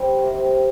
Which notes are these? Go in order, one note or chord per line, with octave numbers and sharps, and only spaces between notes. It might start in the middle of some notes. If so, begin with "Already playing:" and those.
Already playing: D3 G3 C4 F4
C3 D#3 A#3